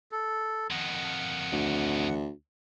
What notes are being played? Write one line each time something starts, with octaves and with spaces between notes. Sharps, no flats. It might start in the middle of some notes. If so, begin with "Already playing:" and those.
A4
F2 D#3 F#5
D2